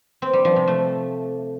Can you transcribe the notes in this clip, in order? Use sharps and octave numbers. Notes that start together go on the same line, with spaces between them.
C4
G3
F3
C3
A3